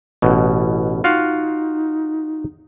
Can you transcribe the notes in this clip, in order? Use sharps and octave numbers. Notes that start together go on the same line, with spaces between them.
A1 B2
D#4 F4 F#4 F5